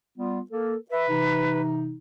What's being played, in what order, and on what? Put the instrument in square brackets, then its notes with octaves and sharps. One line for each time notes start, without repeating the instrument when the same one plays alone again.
[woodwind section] G3 B3 F4
A#3 A4 A#4
[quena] B4 [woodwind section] E5
[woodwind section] C3 E3 D#4